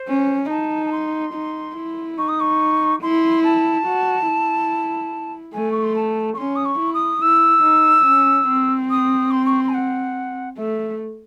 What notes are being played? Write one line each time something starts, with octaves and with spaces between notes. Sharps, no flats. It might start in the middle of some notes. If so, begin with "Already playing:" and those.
Already playing: C5
C#4
D#4 A5
A5
C6
D#4
E4
D#4 C#6
D#6
C#6
E4 C6
A5
F#4
E4
A3 G#5
C#6
C6
A5
C#6
C#4 C6
D#6
C#6
E4
D#6
E4 E6
D#4
C#4
C4
D#6
C6
C#6
C6
G#5
F#5
A3 E5